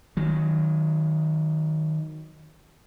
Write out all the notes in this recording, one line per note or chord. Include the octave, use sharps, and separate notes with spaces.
D#3 F#3